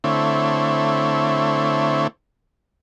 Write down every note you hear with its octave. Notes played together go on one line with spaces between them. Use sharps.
D3 A3 C4 E4 C#5